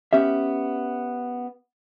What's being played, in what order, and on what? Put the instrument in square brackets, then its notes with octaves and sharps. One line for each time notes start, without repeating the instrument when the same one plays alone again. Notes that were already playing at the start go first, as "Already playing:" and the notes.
[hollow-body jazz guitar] B3 C#4 G4 E5